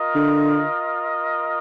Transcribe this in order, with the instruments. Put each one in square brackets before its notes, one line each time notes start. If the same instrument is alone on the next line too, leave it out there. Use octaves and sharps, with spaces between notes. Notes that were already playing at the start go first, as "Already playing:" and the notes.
Already playing: [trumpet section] F4 A#4 D#5
[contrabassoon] D3